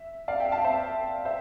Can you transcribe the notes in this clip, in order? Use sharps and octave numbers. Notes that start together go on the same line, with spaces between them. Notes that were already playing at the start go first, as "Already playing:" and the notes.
Already playing: E5
D5 F5
E5 G5
F5 A5
C5 E5
C5 E5